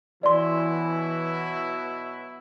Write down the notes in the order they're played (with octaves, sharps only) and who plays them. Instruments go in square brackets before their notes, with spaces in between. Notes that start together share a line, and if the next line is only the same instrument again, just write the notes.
[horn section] B2 F#3 E4 [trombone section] E3 [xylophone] D5 C6